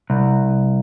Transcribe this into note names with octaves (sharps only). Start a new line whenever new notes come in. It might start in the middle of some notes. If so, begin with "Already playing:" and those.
C2